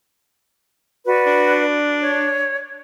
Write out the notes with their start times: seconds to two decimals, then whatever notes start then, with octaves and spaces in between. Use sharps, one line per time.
1.06 F#4 B4 D5
1.26 D4
2.01 C#5